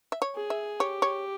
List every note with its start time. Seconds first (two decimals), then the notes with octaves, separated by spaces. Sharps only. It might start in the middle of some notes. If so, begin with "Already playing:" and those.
0.12 E5
0.22 C#5
0.36 G#4
0.50 E5
0.80 G4 C#5
1.02 C#5